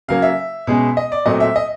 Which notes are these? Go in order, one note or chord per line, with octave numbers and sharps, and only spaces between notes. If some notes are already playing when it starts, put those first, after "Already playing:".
C#3 F#3 A#3 F5
E5
B2 G#3 C#4
D#5
D5
A#2 F#3 A3 C4 D#5
E5
D#5